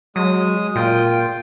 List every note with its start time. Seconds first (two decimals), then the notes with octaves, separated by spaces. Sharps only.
0.16 F#3 G#3 D#6
0.75 A#2 F4 G5